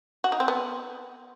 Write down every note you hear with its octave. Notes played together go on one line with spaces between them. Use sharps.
F#4
D#4
C4
B3